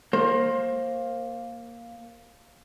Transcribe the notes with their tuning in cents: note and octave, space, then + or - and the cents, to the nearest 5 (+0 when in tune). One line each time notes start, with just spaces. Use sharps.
A#3 +0 C5 +25